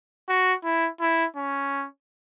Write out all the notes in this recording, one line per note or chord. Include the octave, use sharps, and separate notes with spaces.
F#4
E4
E4
C#4